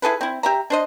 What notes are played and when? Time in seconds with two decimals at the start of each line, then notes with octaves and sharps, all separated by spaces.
0.02 E4 G#4 A4 B4
0.21 C4 E4
0.43 G4 E5 A#5
0.70 D4 C5 D#5